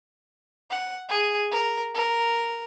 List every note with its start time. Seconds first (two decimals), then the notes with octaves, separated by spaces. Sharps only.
0.71 F#5
1.09 G#4
1.51 A#4
1.95 A#4